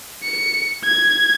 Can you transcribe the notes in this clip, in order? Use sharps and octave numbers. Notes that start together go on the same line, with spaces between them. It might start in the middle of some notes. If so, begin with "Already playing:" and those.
C#7
G#6